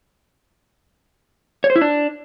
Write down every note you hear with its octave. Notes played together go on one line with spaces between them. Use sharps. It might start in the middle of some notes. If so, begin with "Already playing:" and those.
C#5
C5
E4
D4